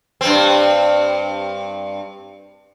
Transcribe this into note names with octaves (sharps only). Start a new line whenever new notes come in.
G2 C4